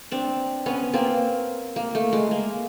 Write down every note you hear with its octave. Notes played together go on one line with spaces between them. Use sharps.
C4 D4
B3 C#4
A#3 C4
A#3
A3
G#3
A#3